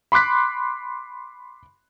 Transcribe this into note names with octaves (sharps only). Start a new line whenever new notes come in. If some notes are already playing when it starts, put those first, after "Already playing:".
B5 C6 D6 F#6 B6